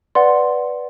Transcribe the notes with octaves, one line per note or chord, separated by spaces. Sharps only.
B4 D5 F#5 C6